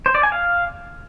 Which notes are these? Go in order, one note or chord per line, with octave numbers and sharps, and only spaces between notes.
C5
D5
G#5
F5